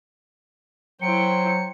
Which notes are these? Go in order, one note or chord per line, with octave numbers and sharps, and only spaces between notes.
F#3 E4 C5 G5 C#7